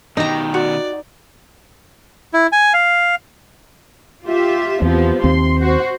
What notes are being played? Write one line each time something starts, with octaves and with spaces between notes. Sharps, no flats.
B2 D#3 D#4 G4 A#5
F#4 D5
E4
G#5
F5
F4 G4 E5
E2 C3 F3 B3
D#2 C4 C6
F#4 C5